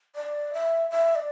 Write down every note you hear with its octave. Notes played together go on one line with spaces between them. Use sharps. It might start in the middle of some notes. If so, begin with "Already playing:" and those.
D5
E5
E5
D5